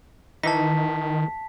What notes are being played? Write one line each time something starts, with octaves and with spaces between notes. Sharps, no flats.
D#3 E3 D#4 A5 B6